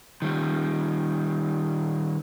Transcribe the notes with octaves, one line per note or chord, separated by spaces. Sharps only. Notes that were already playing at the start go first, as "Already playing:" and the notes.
D#3 G3